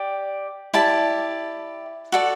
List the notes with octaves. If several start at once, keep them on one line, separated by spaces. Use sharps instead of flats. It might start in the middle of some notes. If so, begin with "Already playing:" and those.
Already playing: G4 D5
E4 G4 D5 A5
F#4 A4 D5